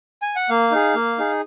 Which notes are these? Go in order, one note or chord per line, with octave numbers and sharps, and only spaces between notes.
G#5
F#5
A#3 F5
D#4 G#4
A#3
D#4 G#4